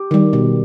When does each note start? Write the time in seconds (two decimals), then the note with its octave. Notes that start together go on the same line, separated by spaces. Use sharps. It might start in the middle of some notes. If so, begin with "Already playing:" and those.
Already playing: G4
0.11 D#3 G3
0.33 B2